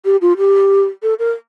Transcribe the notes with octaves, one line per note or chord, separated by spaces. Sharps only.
G4
F4
G4
A4
A#4